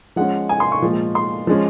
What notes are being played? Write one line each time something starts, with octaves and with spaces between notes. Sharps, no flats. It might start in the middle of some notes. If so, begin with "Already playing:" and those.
F3 G#3 C#4 F#5
G#5
C6
C#6
A#2 F3 G#3
C6
F3 G#3 C#4